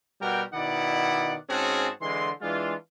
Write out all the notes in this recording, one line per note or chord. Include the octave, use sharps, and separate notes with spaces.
B2 G3 F#4 A#4 G5
B2 D#3 E4 D5 F#5
G#2 C4 C#4 F#4 G#4 A5
D3 E3 G#3 C6
E3 G#3 D4 F4